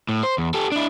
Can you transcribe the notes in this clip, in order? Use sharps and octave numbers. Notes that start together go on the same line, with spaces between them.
A2
C5
E2
G4 A4
D4 E4